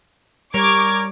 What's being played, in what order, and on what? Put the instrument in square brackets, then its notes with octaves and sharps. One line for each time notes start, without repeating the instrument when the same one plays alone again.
[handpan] G3 [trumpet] A#4 [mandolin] C#5 [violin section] D6 G#6